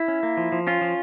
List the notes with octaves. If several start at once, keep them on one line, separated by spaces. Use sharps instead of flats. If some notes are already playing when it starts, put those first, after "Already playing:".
Already playing: E4
C#4
A#3
F3
F3
C#4 F4
F3